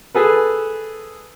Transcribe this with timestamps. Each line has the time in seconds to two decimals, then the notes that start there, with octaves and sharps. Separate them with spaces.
0.15 G#4 A4 B4